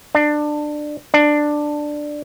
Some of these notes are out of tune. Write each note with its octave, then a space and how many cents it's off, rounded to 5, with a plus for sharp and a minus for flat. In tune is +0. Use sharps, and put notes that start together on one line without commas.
D4 +20
D4 +10